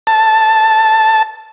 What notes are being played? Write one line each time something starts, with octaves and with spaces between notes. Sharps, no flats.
A5